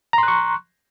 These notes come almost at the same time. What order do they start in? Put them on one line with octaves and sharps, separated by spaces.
A#5 C6 F#6 C#6